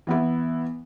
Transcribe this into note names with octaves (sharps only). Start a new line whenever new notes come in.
E3 B3 E4